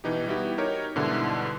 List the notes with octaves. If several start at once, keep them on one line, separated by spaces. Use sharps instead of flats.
B2 E3 D#4 G4
G3 B3 E4 F#4 G4
D#4 G4 A#4 C#5
G#2 B2 D3 G3 E4